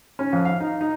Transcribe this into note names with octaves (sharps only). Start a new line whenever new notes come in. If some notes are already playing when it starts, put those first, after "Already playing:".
C#4
F2
F5
D#4
D#4